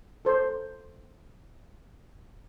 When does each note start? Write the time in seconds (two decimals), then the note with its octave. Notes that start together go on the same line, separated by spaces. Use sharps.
0.25 A4 C5